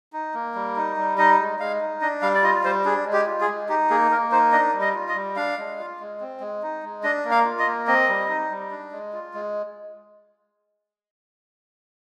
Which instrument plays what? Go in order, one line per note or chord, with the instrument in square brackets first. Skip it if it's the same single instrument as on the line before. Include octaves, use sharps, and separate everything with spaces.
[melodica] D#4
A#3
G3
D#4
G3
D#4 D#5
G#3
G#3 F5
D#4
D4 D#5
G3 F5
D5
F4 D#5
G3 C5
D4 G#4
G#3
G4
F4
G#4
G#3
D#4 G4
A#3 G#4
A#3 A#4
D#4 C5
D4 D#5
G3
D#5
F4
D#5
G3
D4 F5
G#3
F4
G#3
C4
G#3
D#4
G#3
D4 D#5
A#3
F5
F4
D#5
A#3
C4 D#5
G3
D#4
G3
D4
G#3
F4
G#3